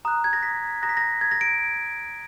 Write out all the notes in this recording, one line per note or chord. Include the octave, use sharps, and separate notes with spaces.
A#5 D#6 F#6
G#6
A#6
B6
A#5 D#6 F#6 A#6
B6
A#6
G#6
A#6
D7